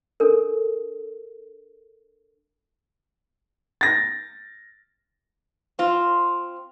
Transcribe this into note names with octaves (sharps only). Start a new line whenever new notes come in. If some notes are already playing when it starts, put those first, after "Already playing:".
D4 A4 A#4
A6 A#6
C4 F4